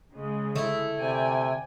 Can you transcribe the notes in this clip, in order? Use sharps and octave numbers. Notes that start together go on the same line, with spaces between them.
C#3 G#3
D3 A3 E4
C3 D5 G5 G#5